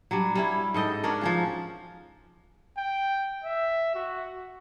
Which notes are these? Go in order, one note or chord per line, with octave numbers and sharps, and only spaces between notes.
F#3 G3 D4
G3 C#4 E4
G#2 A4 D#5 G5
C#4 D4 F#4 A#4
F3 C#4 F4
G5
E5
F#4